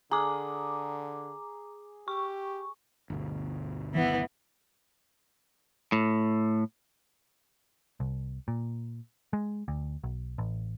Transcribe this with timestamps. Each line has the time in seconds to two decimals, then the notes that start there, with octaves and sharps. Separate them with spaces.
0.11 D3 G#4 A#5 D6
2.08 G4 C#6
3.10 G1 D2 B2
3.94 E3 B3
5.92 A2
8.00 C2
8.48 A#2
9.33 G#3
9.68 D2
10.04 B1
10.38 A1